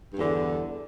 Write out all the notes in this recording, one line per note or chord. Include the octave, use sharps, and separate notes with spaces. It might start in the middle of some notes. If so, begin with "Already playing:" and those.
E2 G2 D3